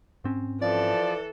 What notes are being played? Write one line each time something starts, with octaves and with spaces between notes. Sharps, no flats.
G#2 C4 C#4
E3 F3 A4 D5